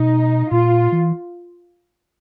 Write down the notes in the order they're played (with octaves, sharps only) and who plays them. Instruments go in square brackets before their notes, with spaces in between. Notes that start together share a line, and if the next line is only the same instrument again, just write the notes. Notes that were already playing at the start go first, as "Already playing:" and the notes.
Already playing: [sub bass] B2 [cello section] D#4
[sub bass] A#2 [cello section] F4
[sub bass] E3